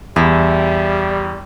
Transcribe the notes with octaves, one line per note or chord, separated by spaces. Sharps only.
E2 G3 E4